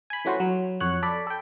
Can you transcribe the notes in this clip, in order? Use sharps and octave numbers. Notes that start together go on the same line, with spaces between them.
G#5 B5
E3 A3 C#4 F#4 B4 C5
F#3
F2 C#5 F#5 F#6
A4 D5 B5
A4 G5